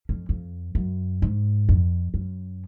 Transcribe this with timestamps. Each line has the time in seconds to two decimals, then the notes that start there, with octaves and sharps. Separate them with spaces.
0.09 F2
0.29 F2
0.75 F#2
1.22 G#2
1.69 F2
2.14 F#2